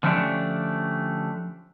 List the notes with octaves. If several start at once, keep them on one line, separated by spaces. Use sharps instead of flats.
D3 F3 A3 C#4 D4 G4